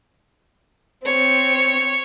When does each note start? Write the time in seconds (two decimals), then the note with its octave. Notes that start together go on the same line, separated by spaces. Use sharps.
1.06 C4 C#5